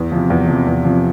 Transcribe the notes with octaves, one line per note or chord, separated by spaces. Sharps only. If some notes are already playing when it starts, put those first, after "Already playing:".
Already playing: E2
C3 F3
E2
C3 F3
E2
C3 F3